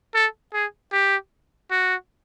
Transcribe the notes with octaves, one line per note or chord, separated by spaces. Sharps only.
A4
G#4
G4
F#4